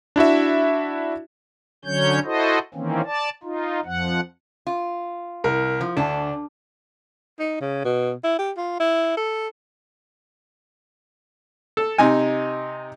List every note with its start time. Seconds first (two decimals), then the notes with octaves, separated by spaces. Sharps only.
0.16 D4 E4 F#4 E5
1.85 D3 F#3 C#4 C#5 G6
2.24 E4 F#4 A4 C5 D#5
2.74 D#3 E3 A#3 C4 C#4
3.06 D5 A5
3.43 D#4 F4
3.85 F2 F3 F#5
4.67 F4
5.44 C2 A#4
5.81 F3
5.97 D2 D4 A5
7.39 D#4
7.61 C#3
7.85 B2
8.24 E4
8.39 G4
8.57 F4
8.80 E4
9.17 A4
11.77 A4
11.98 C3 D#4 G#5